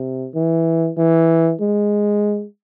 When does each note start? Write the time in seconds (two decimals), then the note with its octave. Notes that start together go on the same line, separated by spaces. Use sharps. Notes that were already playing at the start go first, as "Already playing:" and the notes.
Already playing: C3
0.35 E3
0.97 E3
1.60 G#3